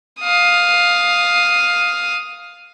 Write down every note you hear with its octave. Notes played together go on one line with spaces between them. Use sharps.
F5 D#6